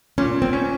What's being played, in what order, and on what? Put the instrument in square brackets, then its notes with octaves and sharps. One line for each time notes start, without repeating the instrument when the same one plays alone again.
[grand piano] A#2 [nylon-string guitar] C#4
[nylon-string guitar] C4
[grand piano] C#4